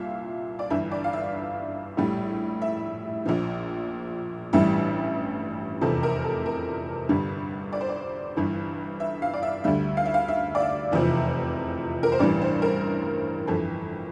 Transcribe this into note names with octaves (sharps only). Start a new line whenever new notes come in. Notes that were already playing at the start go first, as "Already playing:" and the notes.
Already playing: C2 A#2 E5 F5
D5
G1 G2 E3 E5
D5
F5
E5
A#1 A2 G3
E5
A#1 A#2 F3
A1 G2 E3 G3 E5
F1 E2 C3 F3 A4
A#4
A4
A#4
G1 G2 D3 G3
D5
C5
D5
G1 G2 E3
E5
F5
D5
E5
D2 D3 G3 E5
F5
E5
F5
E5
D5
E5
F1 E2 C3 F3
A#4
C5
A1 G2 E3 G3 D5
C5
A#4
G1 F2 E3 A4